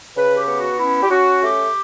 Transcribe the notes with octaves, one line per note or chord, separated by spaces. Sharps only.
C#3 B4
G4
B3
F#4
C#4 E4
G4
C#4 F#4
A3 G4